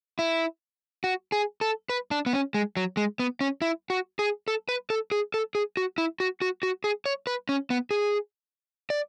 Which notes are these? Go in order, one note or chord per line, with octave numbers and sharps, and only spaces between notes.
E4
F#4
G#4
A4
B4
D4
B3
C#4
G#3
F#3
G#3
B3
C#4
E4
F#4
G#4
A4
B4
A4
G#4
A4
G#4
F#4
E4
F#4
F#4
F#4
G#4
C#5
B4
C#4
B3
G#4
D5